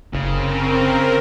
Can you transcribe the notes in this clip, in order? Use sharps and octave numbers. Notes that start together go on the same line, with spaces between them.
F#1 C#3 C4 A#4